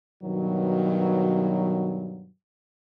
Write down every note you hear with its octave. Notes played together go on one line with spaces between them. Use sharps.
G2 B2 D#3 F#3